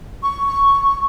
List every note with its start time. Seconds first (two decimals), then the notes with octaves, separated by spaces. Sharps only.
0.23 C#6